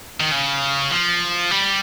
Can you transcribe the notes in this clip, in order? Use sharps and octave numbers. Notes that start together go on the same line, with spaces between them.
D#3
C#3
F3
G3